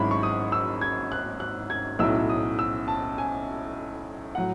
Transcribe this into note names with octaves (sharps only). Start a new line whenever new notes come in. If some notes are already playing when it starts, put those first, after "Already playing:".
Already playing: G#1 G#2 F#3 C#4 E4 B5
C#6
D#6
E6
G#6
F#6
F#6
G#6
B1 A2 F#3 C#4 E4 E6
D#6
E6
A5
G#5
A2 F#3 F#5